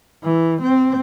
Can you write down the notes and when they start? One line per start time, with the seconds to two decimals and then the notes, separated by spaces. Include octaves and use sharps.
0.24 E3
0.62 C4